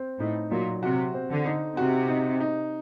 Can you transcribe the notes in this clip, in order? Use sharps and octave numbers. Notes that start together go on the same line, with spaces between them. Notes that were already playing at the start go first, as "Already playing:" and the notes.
Already playing: C4
A2 D#4
A#2 F#3
C3 F#4
C4
D3
D#4
C3 F#4
D#4
D#4